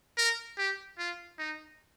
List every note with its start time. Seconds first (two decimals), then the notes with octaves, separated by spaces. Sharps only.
0.17 A#4
0.58 G4
0.98 F4
1.39 D#4